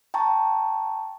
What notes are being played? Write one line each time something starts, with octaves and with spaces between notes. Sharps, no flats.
G5 A5 A#5 C#6